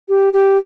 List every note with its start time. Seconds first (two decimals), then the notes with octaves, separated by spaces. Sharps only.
0.09 G4
0.33 G4